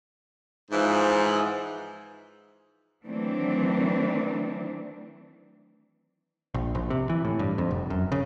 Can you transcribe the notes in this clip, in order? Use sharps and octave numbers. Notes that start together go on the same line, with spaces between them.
G#2 E3 F3
D#3 E3 F#3 A3 C4 D4
A#1
A#1
C3
E3
A2
G2
F2
F1
F#2
C#3